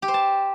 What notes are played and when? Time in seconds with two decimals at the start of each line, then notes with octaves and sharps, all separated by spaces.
0.02 G4
0.08 C5
0.14 A5